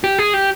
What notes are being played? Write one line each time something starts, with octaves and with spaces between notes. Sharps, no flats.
G4
G#4
G4